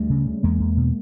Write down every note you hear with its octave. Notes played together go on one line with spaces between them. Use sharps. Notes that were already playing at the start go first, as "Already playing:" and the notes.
Already playing: D2 G3 A3
C#3
C#3
E2 G#3 A#3
E2
B2